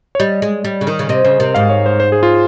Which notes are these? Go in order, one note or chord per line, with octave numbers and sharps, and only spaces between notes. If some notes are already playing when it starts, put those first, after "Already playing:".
C#5
G3 D#5
G#3
G3
C#3
D#3
C#3
C3 D#5
C#3 C5
C3 A#4
G#2 F5
C#5
C5
C5
G#4
F4